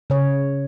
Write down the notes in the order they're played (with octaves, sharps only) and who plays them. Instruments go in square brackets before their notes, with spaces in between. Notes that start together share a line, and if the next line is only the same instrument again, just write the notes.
[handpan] C#3 C#5